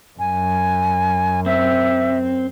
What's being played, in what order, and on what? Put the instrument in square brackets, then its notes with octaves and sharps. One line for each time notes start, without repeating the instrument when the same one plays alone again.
[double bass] F#2 [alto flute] G#5
[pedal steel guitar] C4 [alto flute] E5